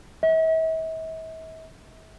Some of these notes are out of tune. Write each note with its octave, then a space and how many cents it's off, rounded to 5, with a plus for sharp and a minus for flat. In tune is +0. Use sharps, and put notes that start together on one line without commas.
E5 -45